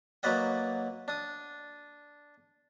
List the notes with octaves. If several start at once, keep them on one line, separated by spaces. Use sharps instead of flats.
F#3 A#3 B4 D5 D#5 F#5
D4 D#6